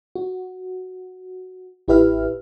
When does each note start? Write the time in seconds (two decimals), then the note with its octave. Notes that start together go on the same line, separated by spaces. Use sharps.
0.15 F#4
1.88 A1 E4 G4 B4 E5 F6